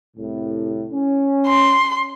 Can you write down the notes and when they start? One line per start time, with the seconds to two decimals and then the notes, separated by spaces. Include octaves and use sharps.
0.17 C2 A2
0.91 C#4
1.47 C6